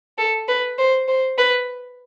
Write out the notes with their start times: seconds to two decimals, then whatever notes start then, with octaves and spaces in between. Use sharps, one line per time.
0.18 A4
0.48 B4
0.79 C5
1.08 C5
1.38 B4